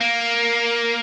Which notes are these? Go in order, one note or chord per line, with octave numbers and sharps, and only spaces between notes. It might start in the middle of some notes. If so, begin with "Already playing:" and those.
A#3